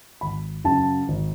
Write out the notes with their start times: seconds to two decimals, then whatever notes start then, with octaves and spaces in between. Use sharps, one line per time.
0.21 G#1 B5
0.64 F#2 C#3 F#3 A5
1.08 G#1